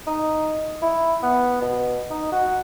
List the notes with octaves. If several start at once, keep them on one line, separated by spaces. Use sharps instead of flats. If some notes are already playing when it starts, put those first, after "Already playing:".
D#4
E4
B3
B2
D#4
F#4